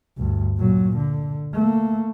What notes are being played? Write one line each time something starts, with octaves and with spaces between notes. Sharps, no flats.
D2 G2
A#2 F#3
D3
A3 A#3